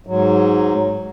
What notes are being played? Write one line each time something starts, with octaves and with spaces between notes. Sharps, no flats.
G#2 F#3